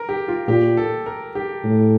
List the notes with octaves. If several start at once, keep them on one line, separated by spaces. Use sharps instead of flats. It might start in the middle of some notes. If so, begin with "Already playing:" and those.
Already playing: A#4
G4
F4
A#2 G4
A4
A#4
G4
A2